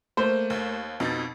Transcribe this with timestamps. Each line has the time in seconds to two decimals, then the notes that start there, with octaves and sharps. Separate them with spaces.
0.17 A3 A#3 C5
0.50 D#2
1.00 F2 B2 D#4 A6